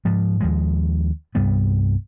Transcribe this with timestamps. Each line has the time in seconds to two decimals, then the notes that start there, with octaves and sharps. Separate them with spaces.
0.05 G#2 F3
0.40 D#2 F3 G#3
1.35 C2 G2 G3 B3